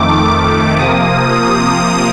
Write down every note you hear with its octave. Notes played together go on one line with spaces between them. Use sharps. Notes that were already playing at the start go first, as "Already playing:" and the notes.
Already playing: F2 D#3 A3 D6
D6
C3 F3 A#3 D#6